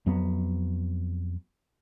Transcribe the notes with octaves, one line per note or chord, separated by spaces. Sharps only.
F2 F#3 B3